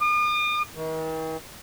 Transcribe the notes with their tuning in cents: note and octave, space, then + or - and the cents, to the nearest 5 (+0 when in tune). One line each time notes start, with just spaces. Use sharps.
D#6 -45
D#3 +45